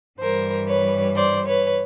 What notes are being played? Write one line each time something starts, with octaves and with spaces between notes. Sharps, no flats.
G2 E3 G3 A#4 C5
B4 C#5
C5 D5
B4 C#5